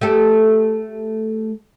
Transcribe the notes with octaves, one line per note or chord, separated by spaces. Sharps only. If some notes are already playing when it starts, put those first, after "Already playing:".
A3 G4 A4